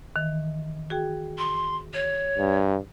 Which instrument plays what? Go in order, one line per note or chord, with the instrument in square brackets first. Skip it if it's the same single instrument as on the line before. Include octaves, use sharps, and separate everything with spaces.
[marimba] D#3 E3
F#4 G#4 G5
[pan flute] C6
C#5
[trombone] G2